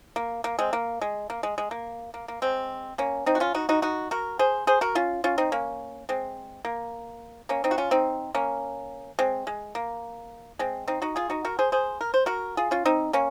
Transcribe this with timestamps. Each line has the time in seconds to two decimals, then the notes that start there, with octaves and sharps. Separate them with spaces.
0.16 A#3
0.44 A#3
0.59 G#3 C4
0.73 A#3
1.01 G#3
1.30 A#3
1.43 G#3
1.58 G#3
1.71 A#3
2.14 A#3
2.28 A#3
2.42 G#3 C4
2.98 A#3 C#4
3.26 C4 D#4
3.35 F#4
3.40 C#4 F4
3.55 D#4 F#4
3.69 D#4 F#4
3.82 D#4 F#4
4.11 F#4 A#4
4.39 G#4 C5
4.67 G#4 C5
4.81 F#4 A#4
4.95 C#4 F4
5.24 C#4 F4
5.38 C4 D#4
5.52 A#3 C#4
6.09 G#3 C4
6.65 A#3
7.49 A#3 C#4
7.64 C4 D#4
7.71 F#4
7.78 C#4 F4
7.91 C4 D#4
8.35 A#3 C#4
9.19 G#3 C4
9.47 G#3
9.75 A#3
10.59 G#3 C4
10.88 C4 D#4
11.02 D#4 F#4
11.16 F4 G#4
11.30 D#4 F#4
11.45 F#4 A#4
11.59 G#4 C5
11.72 G#4 C5
12.01 A#4
12.14 C5
12.26 F#4 A#4
12.57 F4 G#4
12.71 C#4 F4
12.85 C4 D#4
13.13 A#3 C#4